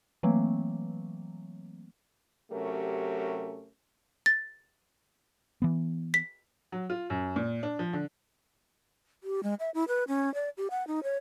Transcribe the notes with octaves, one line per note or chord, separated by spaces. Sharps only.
E3 F#3 A3 A#3 C4
C3 F#3 A3 C#4 G4 A#4
A6
E3 B3
B6
F#3
F4
F#2
A#2
D4
F3
D3
G4
G#3
E5
E4
B4
C#4
D5
G4
F#5
D#4
C#5